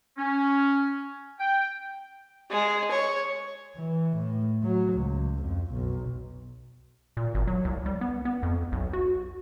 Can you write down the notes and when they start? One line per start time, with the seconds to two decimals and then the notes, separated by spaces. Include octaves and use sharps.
0.18 C#4
1.40 G5
2.51 G#3
2.91 C#5
3.76 E3
4.17 A2
4.63 F#3
4.93 C#2
5.42 F2
5.72 B1
7.17 A#2
7.35 G#1
7.47 F#3
7.65 C2
7.86 G3
8.01 B3
8.25 B3
8.43 F2
8.72 B1
8.93 F#4